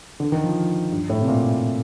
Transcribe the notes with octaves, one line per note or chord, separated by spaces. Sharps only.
D3
D#3
F3
G2
A2
C3
A#2